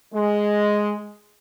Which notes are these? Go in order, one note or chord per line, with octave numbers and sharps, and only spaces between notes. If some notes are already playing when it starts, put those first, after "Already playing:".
G#3